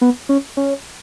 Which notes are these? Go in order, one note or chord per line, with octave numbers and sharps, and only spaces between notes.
B3
C#4
C#4